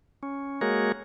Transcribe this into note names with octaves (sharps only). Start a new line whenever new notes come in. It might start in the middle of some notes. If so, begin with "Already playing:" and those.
C#4
G#3 A#3 F#4 G#4 A#4 C#5